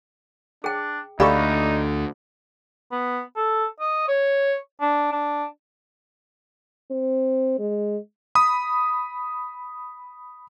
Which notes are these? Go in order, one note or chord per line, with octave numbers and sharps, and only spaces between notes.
D4 G#4 G5
D2 D#4 G4 A4 D5 F5 B5 C#6
B3
A4
D#5
C#5
D4
D4
C4
G#3
B5 D#6